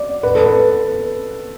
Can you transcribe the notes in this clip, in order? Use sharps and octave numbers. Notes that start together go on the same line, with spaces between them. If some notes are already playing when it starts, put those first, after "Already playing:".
Already playing: D5
B4
A4
B4